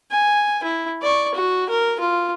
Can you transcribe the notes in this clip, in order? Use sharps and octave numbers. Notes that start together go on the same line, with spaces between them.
G#5
E4
D5 C#6
F#4
A#4
F4